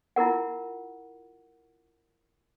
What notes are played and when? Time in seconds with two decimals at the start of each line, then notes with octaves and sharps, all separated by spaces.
0.16 E4 F4 A#4 F#5